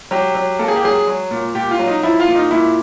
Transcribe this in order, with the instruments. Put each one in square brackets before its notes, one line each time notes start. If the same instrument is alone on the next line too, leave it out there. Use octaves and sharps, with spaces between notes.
[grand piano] F#3 G4
F#3
A#3 A4
G#4
G4
F#3 G#4
F#3
A#2
A#2 G4
F4
F#3
D#4
F3 E4
F4
A#2
D#4
A#2 E4